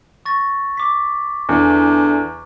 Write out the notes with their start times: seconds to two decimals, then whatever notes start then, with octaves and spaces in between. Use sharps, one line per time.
0.25 C#6 A6 A#6
0.77 D6 B6
1.49 E2 D3